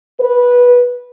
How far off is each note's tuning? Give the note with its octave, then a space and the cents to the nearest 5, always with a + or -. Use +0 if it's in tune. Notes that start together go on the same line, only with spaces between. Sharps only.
B4 -15